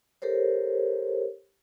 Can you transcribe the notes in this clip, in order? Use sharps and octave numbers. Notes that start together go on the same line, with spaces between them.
G4 A4 A#4 C5 C#5